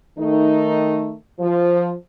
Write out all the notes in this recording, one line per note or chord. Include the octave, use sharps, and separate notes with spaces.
D#3 A3 D#4
F3